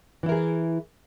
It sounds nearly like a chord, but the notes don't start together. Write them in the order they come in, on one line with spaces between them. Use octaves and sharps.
E3 E4 A#4 G#4